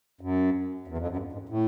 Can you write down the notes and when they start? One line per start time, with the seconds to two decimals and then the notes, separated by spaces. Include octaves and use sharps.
0.21 F#2
0.88 E2
0.98 F2
1.08 F#2
1.17 G2
1.33 G#2
1.49 A2